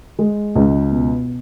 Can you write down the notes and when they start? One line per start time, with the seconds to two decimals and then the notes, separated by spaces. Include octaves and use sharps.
0.19 G#3
0.56 C#2
0.92 B2